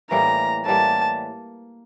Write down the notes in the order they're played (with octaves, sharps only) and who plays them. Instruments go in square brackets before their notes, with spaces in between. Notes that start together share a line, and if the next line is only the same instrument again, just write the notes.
[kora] A2 E3 G3 A#3 [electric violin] A#5
[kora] A2 E3 G3 A#3 [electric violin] A5